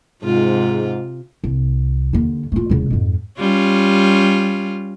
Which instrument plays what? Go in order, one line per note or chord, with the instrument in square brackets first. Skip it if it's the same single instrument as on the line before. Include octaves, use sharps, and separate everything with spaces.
[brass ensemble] G#2 [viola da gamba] C3 F4
[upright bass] C2
D#2 D3
A3 F4
E1 C#3
F2 G#2
[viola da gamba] G3 C#4 F4